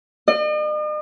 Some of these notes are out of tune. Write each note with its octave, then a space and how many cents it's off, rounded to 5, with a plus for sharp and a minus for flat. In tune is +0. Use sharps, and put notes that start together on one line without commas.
D#5 -45